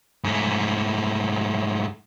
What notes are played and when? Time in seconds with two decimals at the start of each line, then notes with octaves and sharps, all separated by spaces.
0.24 G#2 A3